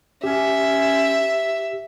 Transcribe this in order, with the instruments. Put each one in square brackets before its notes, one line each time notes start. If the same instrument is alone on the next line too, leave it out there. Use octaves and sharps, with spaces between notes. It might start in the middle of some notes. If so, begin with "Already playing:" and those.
[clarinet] C#4 [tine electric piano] G4 [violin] E5